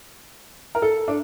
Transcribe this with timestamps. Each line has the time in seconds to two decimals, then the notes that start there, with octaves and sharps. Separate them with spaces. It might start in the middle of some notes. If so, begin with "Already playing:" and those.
0.75 A#4
0.82 A4
1.08 D4